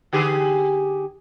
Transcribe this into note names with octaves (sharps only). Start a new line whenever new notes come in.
D3 G4 G#4